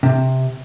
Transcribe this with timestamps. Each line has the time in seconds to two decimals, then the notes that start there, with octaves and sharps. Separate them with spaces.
0.03 C3